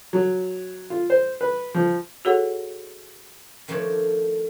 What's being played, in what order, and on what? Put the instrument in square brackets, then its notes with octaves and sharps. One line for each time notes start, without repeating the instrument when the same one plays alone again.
[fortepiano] F#3
F4
C5
B4
F3
[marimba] F#4 G#4 A4 C#5 F#5
[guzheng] D#3 F3 A3 D4 A#4 C#5